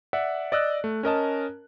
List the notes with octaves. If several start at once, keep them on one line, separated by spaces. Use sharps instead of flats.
D5 E5 F#5
D5 D#5 E6 F#6
A3
C#4 A#4 D#5 A5